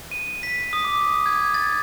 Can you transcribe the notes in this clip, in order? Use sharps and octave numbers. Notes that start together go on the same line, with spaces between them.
D#7
B6
D#6
D6
G#6
A6